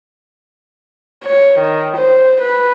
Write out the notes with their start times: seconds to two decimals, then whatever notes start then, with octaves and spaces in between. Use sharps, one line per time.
1.24 C#5
1.59 D#3
1.97 C5
2.42 B4